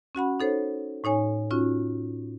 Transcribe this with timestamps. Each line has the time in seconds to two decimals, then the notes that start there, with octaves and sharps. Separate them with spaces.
0.15 C#4 F#4 F#5 B5
0.40 D#4 A4 C5 C#5
1.04 A2 D#4 C#5 G#5
1.51 C#4 D#4 F4 F#4